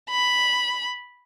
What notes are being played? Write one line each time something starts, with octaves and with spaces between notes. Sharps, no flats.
B5